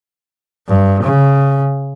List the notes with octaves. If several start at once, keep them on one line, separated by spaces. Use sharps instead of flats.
G2
C#3